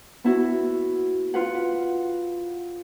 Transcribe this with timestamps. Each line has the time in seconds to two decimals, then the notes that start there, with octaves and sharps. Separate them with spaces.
0.24 B3 E4 F#4
1.34 F4 B4 F#5